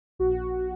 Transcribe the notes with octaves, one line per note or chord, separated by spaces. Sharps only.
A#1 F#4